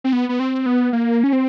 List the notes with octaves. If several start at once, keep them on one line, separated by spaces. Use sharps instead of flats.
C4
B3
B3
C4
B3
A#3
C#4
C4